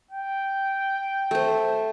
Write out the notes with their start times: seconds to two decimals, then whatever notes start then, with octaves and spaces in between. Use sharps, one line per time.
0.11 G5
1.31 A3 C5